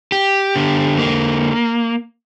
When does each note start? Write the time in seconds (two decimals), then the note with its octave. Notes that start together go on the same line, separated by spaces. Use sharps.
0.12 G4
0.56 D3
0.99 A#3